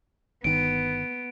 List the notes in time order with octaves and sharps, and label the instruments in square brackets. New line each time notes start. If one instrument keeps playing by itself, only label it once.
[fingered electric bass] G1 D#3 [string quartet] B3 [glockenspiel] D7